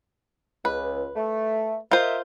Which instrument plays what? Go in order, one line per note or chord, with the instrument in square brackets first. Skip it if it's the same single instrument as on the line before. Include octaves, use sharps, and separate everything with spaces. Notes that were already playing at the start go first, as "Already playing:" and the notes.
[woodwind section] C#2 [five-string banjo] B4
[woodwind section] A3
[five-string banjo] F4 C5 [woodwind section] A#4 D#5 E5